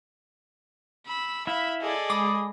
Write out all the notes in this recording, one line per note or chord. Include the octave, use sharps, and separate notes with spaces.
B5 E6
E4 E5 F5 B5
G#4 A4 D5 D#5
G#3 B5 D6 D#6